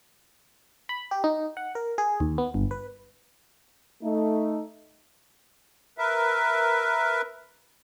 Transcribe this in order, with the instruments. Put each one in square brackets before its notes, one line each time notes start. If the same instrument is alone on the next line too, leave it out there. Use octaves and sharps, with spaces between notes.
[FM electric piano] B5
G4
D#4
F#5
A#4
G#4
D#2
B3
G1
B4
[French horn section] A3 D#4
[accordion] A#4 B4 E5